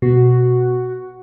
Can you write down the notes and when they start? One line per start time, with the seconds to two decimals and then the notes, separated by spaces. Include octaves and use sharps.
0.02 B2 F#4